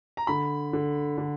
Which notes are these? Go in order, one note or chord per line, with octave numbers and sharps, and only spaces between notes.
A#5
D3 B5
D3
D3